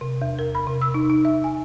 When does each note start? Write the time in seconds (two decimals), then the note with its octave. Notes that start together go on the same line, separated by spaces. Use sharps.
0.01 C3
0.22 E2
0.39 A#4
0.55 B5
0.67 C3
0.82 E6
0.94 D#4
1.10 D#4
1.25 E5
1.44 G#5